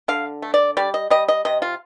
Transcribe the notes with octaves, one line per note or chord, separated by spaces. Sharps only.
D3 F5
A3
D5
G3 D5
D#5
G3 D#5
D#5
C3 D#5
F4